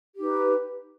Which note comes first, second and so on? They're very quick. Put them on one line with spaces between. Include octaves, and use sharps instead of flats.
G4 D#4 B4